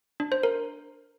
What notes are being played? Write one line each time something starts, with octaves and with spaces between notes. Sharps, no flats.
D4
C5
A#4